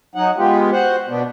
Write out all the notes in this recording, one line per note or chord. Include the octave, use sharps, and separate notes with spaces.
F#3 D#4 F#5
G#3 B3 F4 G4
F#4 C5 F#5
B2 B3 D4